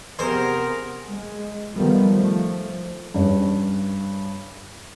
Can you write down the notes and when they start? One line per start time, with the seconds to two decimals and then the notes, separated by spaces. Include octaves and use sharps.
0.19 C3 B3 G#4 A#4 C5
1.07 G#3
1.74 D#3 F3 G3 A3 B3
2.09 F3 A3
3.14 G2 C#4 C#5